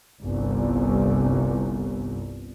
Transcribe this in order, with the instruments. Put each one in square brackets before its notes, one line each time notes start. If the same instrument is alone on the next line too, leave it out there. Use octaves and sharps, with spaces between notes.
[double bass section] G1 C2